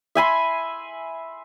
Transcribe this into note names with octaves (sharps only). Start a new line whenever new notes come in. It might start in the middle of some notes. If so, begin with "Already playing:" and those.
E5 G#5 B5 C6